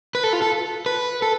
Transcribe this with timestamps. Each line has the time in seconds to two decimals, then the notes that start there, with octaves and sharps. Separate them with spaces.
0.15 B4
0.24 A4
0.33 F4
0.42 A4
0.86 B4
1.22 A4